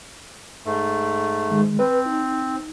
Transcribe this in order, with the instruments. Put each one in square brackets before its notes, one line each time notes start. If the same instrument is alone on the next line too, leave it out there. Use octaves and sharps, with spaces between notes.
[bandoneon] G#2 A3
[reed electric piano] D#3 G#3
[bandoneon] C4 [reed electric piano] B4
[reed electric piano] D#4